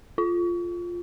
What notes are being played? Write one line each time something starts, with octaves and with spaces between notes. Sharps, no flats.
F4